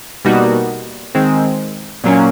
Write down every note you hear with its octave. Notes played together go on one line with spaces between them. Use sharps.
B2 G3 A#3 D#4 F#4
D#3 G#3 C4
A#2 F#3 A#3 C#4